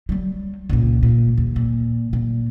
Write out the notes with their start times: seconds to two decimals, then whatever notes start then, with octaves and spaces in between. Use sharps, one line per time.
0.09 F#3 G3
0.69 C#2 A#2
1.03 A#2
1.38 D#2
1.56 A#2
2.13 A#2